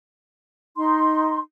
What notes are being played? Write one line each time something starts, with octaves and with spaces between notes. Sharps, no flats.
D#4 C6